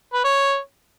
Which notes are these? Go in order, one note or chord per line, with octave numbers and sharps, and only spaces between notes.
B4
C#5